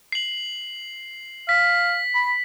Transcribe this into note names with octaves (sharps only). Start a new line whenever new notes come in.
C7 F#7
F5 B6
B5